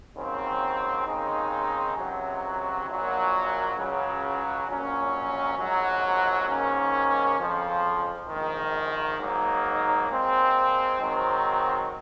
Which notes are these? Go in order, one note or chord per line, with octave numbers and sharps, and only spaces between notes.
D#2 C#3 F#3 C4
D#2 C#3 G#3 C4 D#4
C#2 C3 F#3
A#1 A#2 F#3
C#2 C#3 F#3
A#1 A#2 F#3 C#4
A#1 G#2 F#3
G#2 D#3 A#3 C#4
F2 C#3 F3
A#1 G#2 D#3
G#2 F#3 A#3 D#4
A#2 G#3 C4
G#2 D#3 F#3 C4 D#4